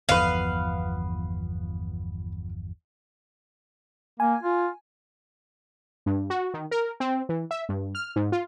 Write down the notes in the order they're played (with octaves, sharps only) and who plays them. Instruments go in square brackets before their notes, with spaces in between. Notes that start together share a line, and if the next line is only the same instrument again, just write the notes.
[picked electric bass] G1 E2 F3 [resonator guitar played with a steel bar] B3 B4 [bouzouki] F5
[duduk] A#3 [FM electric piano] G#5
[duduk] F4
[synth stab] G2
F#4
D#3
A#4
C4
E3
E5
G2
F6
G#2
F4